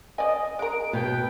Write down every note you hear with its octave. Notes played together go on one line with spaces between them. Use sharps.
D5 D#5 G#5
G#3 A#4 D7
B2 B4 G5